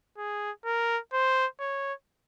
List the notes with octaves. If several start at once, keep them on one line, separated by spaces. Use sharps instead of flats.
G#4
A#4
C5
C#5